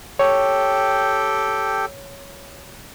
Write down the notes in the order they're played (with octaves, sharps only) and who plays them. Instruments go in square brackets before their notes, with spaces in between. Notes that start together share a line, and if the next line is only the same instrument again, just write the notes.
[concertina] G4 A4 G5 [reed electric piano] C#5